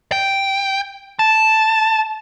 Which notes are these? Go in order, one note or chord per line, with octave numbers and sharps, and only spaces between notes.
G5
A5